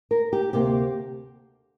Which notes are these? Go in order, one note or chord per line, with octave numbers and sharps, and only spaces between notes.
A#4
G4
D2 C3 A#3 G4